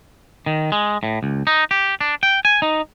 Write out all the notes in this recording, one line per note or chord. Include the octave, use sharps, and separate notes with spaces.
D#3
G#3
A2
C#2
D#4
G4
D4
G5
G#5
D#4